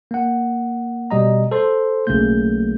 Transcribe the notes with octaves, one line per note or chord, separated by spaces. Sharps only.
A#3 F#5
B2 G3 D#5 A#5
A4 C5 C6
B1 C#3 F#3 A3 A#3 G6